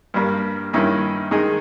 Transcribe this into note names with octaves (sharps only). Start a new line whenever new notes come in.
G2 G3 A#3
G2 D#3 A#3 C#4 E4
D#3 G#3 D#4 G#4